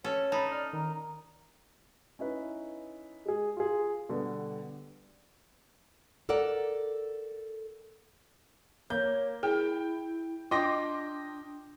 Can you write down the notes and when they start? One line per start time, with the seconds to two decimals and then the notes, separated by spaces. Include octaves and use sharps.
0.04 C#4 A4 C#5
0.32 D#4 A5 B5
0.52 D5 F6
0.73 D#3 A#5
2.19 C#4 D#4 E4 B4
3.26 G#3 G#4
3.57 F4 G#4
4.09 B2 D3 G3 B3
6.29 A4 A#4 D5 F#5
8.90 A#3 C#5 G6
9.43 E4 G#4 G5
10.51 D4 F4 D#5 G5 C6 D6 A#6